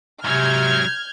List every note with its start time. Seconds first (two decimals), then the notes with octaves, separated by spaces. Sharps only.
0.24 G#2 C3 F#3 F6 G6 G#6